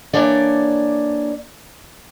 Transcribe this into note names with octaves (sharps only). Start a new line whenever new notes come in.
E3 A3 A#3 D4 C#5 D5